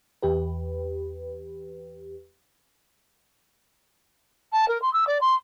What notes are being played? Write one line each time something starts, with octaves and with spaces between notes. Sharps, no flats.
E2 G4 B4
A5
A#4
C6
E6
D5
C6